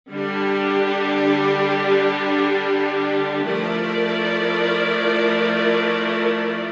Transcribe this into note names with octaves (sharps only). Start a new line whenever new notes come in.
D3 G3 D4 G4
F3 A3 E4 A#4 D5